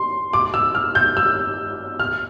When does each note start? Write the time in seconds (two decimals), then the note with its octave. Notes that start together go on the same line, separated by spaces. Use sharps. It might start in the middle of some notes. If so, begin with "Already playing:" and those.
Already playing: C6
0.33 D6
0.54 E6
0.75 F6
0.95 G6
1.17 E6
2.00 F6